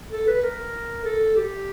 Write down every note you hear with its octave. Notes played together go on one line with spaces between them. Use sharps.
A4
B4
A#4
A4
G4